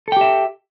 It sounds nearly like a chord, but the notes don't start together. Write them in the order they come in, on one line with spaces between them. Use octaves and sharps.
A4 G5 G4 E5